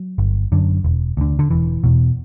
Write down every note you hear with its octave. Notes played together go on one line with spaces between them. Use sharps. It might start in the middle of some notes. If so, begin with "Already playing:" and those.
Already playing: F#3
G1
F#2 D3
E1
D2 D3
D3
E1 E3
E2 B2